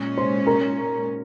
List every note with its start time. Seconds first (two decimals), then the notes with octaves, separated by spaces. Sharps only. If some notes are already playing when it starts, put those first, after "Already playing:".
Already playing: A#2 G#3 C#4
0.17 C5 C6
0.47 A#4 A#5